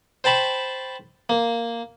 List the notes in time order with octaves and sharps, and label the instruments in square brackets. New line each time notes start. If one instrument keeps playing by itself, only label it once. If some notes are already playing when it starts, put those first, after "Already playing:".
[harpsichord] C5 G5 A5 B5 C#6
A#3